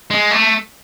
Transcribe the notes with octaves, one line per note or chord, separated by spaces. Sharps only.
G#3
A3